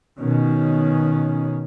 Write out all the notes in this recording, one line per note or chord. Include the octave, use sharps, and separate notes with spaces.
B2 D#3 C#4